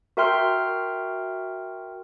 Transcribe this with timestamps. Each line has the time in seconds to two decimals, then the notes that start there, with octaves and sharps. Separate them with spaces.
0.17 F#4 A#4 E5 G5 C6 F6